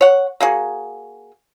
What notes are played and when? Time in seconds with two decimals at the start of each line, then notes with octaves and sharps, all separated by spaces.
0.01 C#5 F#5
0.40 A#3 F#4 G#4